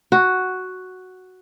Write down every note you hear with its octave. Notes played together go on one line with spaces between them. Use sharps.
F#4